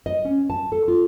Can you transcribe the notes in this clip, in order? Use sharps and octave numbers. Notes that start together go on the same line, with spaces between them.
D#5
C#4
A5
A4
F4